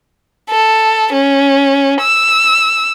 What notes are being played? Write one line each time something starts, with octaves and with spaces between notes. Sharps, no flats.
A4
C#4
E6